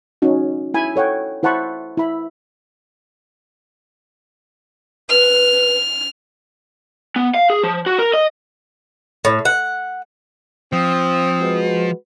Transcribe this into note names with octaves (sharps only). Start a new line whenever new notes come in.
C#4 D#4 F#4
E4 G#5 B5
A4 C#5 F#5 G5
E4 C5 F#5 A5 B5 C#6
E4 B5
B4 F6
B3
F5
G#4
F3
F#4
A#4
D#5
A2
F#5
F3 C4 D#6
G#3 F#4 B4